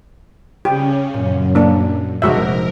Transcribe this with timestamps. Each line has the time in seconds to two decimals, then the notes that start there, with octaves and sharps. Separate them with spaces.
0.65 C#3 C#4 G4
1.14 F#2 A#2
1.55 A#3 D4
2.22 F1 C3 G#3 F#4 A#4 E5